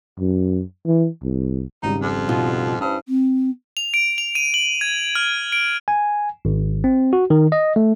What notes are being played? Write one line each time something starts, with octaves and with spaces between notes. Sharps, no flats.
F#2
E3
C2
G#1 C#3 G3 D#4
F2
B2 D#4 F4
G2 C#4 E4 C5
C4
F7
D7
F7
D#7
F#7
G#6
F6
D7
G#5
G#1
C4
F#4
D#3
D#5
A3